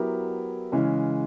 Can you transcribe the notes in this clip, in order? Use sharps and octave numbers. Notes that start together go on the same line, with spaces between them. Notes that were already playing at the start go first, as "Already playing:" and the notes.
Already playing: F#3 B3 E4 G4 A#4
C#3 E3 G#3 C#4